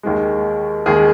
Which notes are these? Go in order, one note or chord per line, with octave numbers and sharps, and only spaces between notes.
D#2 D#3 G#3
D#2 D#3 G#3 G#4